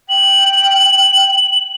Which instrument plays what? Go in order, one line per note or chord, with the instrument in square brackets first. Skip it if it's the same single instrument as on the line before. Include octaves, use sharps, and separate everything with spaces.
[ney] G5 [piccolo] F#7